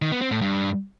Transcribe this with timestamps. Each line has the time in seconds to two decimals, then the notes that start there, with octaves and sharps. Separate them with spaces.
0.02 D#3
0.12 B3
0.21 C4
0.31 A2
0.41 G2